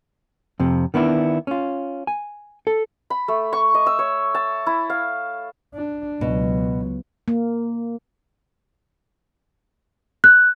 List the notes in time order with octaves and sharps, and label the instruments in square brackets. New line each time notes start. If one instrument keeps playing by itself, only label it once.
[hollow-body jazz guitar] F2 C3
D#3 B3 D4 E4
C#4 F4
G#5
A4
[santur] B5
A3
C#6
D#5
E6
C#5
A5
E4
F5
[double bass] D4
[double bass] C#2 F#3 [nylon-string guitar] B2
[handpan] A#3
[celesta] F#6